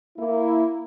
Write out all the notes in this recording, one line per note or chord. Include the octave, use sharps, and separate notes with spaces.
A#3 E4